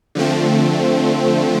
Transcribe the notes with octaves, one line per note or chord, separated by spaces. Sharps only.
D3 F3 A3 C4